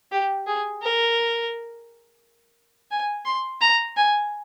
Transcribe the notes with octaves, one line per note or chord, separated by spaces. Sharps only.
G4
G#4
A#4
G#5
C6
A#5
G#5